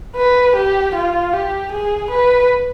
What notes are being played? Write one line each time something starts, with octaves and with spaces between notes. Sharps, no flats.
B4
G4
F4
G4
G#4
B4